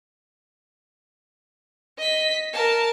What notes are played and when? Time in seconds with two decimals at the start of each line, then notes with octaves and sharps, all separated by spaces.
1.98 D#5 B6
2.53 A#4 A5